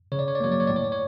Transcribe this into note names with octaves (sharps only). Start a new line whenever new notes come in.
C#3 C#5
D5
C#5
D5
F#3 A#3 C#5
D5
C#5
A2 D5
C#5
D5
C#5